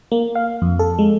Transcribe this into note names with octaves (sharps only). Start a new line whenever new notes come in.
A#3
F5
F2
A4
G#3